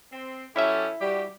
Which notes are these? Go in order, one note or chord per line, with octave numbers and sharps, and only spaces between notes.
C4
F#3 C#4 E4 G4 A4 E5
G3 F#4 G4